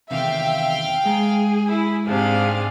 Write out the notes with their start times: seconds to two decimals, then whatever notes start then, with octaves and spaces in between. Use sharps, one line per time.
0.11 E2 C3 D#3 E5 F5 G5
1.06 G#3 G#4 A#5
1.68 E4
2.07 G#2 C3 D4 G#4 F5